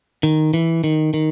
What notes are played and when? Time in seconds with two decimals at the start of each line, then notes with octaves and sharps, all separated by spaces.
0.23 D#3
0.54 E3
0.84 D#3
1.14 D#3